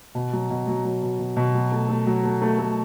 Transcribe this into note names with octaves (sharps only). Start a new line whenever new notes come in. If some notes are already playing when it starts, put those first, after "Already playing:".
B2
F#3
B2
F#3
F#3
B2
B2
B2
F#3
A3
A3
F#3
A3
A3
A3